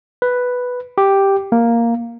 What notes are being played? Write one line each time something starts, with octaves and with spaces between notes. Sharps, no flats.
B4
G4
A#3